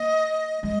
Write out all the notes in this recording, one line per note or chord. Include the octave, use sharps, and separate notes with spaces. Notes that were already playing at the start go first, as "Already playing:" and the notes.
Already playing: A#3 D#5
G#3 D#5